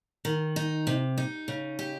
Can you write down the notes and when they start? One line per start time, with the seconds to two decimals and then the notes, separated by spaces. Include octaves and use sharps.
0.25 D#3
0.56 D#4
0.87 C3
1.18 D#4
1.48 C#3
1.79 G4